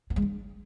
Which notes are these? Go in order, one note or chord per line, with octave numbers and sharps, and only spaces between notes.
B3
G#3
D4